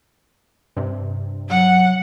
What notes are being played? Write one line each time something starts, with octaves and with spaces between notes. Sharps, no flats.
G2 C3
F#3 F#5